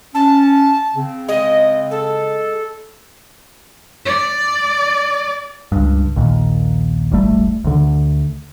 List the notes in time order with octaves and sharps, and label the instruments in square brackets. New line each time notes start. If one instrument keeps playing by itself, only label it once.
[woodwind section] C#4 [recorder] A5
[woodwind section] C#3 C4
[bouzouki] G#3 [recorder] D#5
[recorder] A4
[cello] D5
[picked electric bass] C#2 G2
A#1 D#2 A#2
D#1 G#1 G3 A3
D2 D3